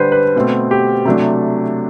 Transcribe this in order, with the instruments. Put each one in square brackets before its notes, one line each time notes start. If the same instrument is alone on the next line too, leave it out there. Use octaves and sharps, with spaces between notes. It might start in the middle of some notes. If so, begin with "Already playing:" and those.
Already playing: [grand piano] D3 G3 D4 B4 C5
B4
B2 A3 C4
G4
C3 F#3 A3 D4